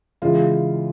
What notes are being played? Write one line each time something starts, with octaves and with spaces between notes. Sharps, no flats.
C#3 E3 G#3 F4